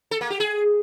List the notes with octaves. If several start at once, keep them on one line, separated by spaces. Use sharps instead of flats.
A4
A#3
G4
G#4